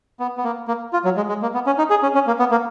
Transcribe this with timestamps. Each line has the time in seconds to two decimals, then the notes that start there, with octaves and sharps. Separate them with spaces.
0.20 B3
0.38 B3
0.44 A#3
0.68 A#3
0.93 F4
1.05 F#3
1.17 G#3
1.29 G#3
1.42 A#3
1.54 B3
1.66 C#4
1.78 D#4
1.90 G#4
2.03 C#4
2.15 C#4
2.27 A#3
2.39 B3
2.51 A#3